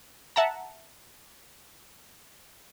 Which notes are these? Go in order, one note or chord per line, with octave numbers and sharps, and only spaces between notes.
E5 F#5 A5 A#5